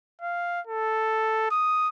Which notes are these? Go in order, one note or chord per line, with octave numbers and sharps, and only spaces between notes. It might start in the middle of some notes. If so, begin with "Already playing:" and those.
F5
A4
D#6